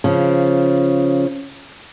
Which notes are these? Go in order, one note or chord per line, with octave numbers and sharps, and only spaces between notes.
C#3 F3